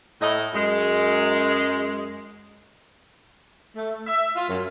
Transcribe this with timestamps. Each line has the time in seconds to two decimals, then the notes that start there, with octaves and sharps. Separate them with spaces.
0.21 A2 D#5
0.54 F#2 G#3
3.76 A3
4.07 E5
4.36 F4
4.48 F#2